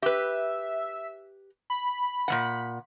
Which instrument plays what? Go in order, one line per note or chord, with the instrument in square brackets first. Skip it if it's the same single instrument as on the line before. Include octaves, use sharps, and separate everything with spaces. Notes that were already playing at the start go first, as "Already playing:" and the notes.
[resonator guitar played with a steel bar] G4 B4 [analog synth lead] E5
[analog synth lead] B5
[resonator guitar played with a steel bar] A#2 G3 F#5